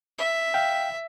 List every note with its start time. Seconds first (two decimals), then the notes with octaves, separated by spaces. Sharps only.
0.18 E5
0.54 F5 G5